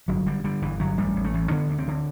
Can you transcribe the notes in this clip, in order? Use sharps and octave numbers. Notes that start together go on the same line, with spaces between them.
G1 F#3
D3 G3
D3 G3
G1 E3
G1 F#3
A1 G3
A1
A3
A1
D3 B3
D2
C4
D3